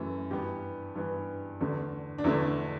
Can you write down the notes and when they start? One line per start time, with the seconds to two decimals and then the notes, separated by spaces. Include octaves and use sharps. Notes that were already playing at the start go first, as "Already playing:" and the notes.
Already playing: F#2 E3 A3
0.31 G2 E3 B3 G4
0.95 G2 E3 B3
1.61 E2 D3 A3
2.18 D4
2.24 E2 D3 A3 E4